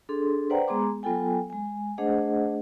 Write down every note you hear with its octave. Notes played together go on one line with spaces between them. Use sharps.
D4 G#4 A4 C6
B4 C5 D5 F#5 G5 A#5
G#3 B3 G#4 A#5 C6 D6
F#3 B3 F4 A4 G5 G#5
G#3 G#5
A3 D4 G#4 C5 D#5 F#5